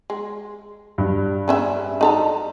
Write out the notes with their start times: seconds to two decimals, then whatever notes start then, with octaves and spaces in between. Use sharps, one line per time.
0.10 G#3
0.98 G2
1.48 C#3 C#4 E5
2.01 D#4 A4 A#5